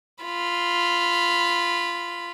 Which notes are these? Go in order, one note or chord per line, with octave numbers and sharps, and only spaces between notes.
F4 B5